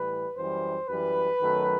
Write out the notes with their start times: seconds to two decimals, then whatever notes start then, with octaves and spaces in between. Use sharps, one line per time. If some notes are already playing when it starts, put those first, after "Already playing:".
Already playing: A2 E3 G3 B4
0.37 F#2 E3 G3 C5
0.89 F#2 E3 G3 B4
1.40 F#2 D#3 F#3 A3